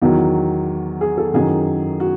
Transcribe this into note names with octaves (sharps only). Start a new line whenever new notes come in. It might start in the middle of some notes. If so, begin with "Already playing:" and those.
E2 D#3 F#3 F#4
G#4
A4
F#2 D#3 F#3 G#4
F#4